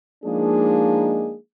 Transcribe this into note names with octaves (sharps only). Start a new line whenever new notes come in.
F3 G#3 A#3 D4 D#4 G#4